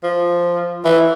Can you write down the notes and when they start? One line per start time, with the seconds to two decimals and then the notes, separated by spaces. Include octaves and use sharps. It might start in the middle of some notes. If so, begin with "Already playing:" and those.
0.03 F3
0.85 E3